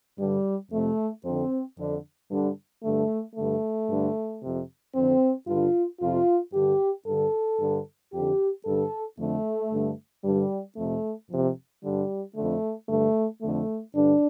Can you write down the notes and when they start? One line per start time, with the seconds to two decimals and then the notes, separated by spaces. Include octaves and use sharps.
0.18 G2 D3 G3
0.71 F2 C3 A3
1.24 F2 D3 C4
1.77 F2 D3
2.30 G2 D3
2.83 G2 D3 A3
3.36 G2 D3 A3
3.89 G2 D3
4.42 F2 C3
4.95 F2 D3 C4
5.48 G2 D3 F4
6.01 F2 C3 F4
6.54 G2 D3 G4
7.06 G2 D3 A4
7.59 G2 D3
8.12 F2 D3 G4
8.65 G2 D3 A4
9.18 F2 D3 A3
9.72 G2 D3
10.24 G2 D3 G3
10.77 F2 C3 A3
11.30 F2 C3
11.83 G2 D3 G3
12.36 F2 D3 A3
12.89 G2 D3 A3
13.42 F2 D3 A3
13.94 G2 D3 D4